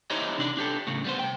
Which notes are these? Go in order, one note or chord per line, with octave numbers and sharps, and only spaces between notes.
D#4 E4 G4 C5 C#5 D#5
C3 D4 D5
D4 G4 A4
A2 C#3
G3 B3 C5
C3 G5